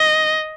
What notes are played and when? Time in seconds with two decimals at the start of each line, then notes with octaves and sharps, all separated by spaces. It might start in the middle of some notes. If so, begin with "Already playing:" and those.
Already playing: D#5